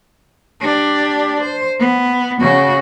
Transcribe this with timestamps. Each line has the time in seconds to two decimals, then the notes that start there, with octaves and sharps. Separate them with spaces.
0.61 D4 G4
1.41 C5
1.79 B3
2.41 C#3 F#4